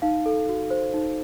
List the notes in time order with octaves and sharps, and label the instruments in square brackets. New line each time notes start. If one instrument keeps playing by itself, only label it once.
[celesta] D#4 F5
A4
F#4
C5
D#4